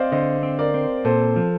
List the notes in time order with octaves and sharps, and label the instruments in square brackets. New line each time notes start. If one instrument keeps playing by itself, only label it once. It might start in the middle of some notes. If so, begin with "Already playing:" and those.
Already playing: [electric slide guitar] C4 [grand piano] C5 D5 D#5 F5
[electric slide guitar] D3 [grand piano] C5 D#5
[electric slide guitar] C4
[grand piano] A#4 D5
[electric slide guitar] C4
[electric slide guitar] A#2 [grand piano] A4 C5
[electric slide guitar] F3